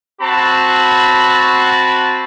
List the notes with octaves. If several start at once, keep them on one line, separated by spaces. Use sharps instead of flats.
C4 F#4 A5 B5